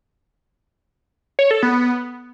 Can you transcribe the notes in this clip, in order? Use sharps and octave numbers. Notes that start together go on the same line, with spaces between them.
C#5
A4
B3